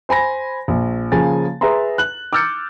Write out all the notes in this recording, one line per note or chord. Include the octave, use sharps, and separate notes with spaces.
C5 G#5 B5 A#6
A#1
C#3 F3 A#3 G#5 A6
G#4 B4 E5 G#5 A#5 C6
F#6 F#7
D6 E6 F6 G6 A6 C#7